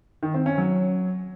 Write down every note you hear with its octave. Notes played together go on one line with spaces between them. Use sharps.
D#3
C4
C#4
F#3